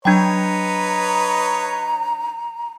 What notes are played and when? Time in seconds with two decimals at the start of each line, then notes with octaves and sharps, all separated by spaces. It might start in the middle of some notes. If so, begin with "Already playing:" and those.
0.05 F#3 D4 B4 C#5 D#5 G5 A#5 G#6